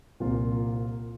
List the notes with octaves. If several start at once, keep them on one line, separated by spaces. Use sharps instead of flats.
C2 A#2 F3 A#3 F4